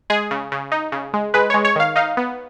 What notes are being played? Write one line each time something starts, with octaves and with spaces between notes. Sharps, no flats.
G#3 G#4
C#3
C#3
D#4
C#3
G#3
G#3 B4
G#3 C#5
C#5
D#3 F5
D#4 F5
B3